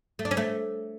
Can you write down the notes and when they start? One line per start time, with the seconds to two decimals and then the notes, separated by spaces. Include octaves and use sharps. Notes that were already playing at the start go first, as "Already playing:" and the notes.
0.19 A3
0.25 D4
0.31 C#4
0.37 A3